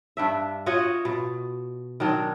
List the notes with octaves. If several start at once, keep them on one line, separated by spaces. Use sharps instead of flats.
G2 D4 E5
F4 F#4 C#5 D#5
B2
D#3 F#3 D4